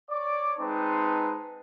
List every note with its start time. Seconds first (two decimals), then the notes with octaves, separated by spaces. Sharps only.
0.10 C#5 D5 D6
0.58 G#3 C4 D#4 B4 C5 A5